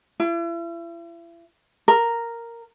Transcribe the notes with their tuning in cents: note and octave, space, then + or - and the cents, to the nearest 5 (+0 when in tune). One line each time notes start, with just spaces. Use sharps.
E4 +40
A#4 -5